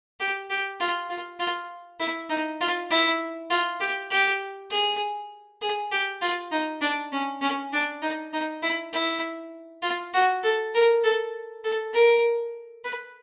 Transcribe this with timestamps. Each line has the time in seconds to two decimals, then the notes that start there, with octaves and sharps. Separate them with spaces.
0.20 G4
0.50 G4
0.80 F4
1.10 F4
1.40 F4
2.00 E4
2.30 D#4
2.61 F4
2.91 E4
3.50 F4
3.80 G4
4.11 G4
4.71 G#4
5.62 G#4
5.92 G4
6.22 F4
6.52 D#4
6.81 D4
7.12 C#4
7.42 C#4
7.73 D4
8.02 D#4
8.33 D#4
8.63 E4
8.93 E4
9.82 F4
10.13 F#4
10.44 A4
10.74 A#4
11.04 A4
11.64 A4
11.93 A#4
12.84 B4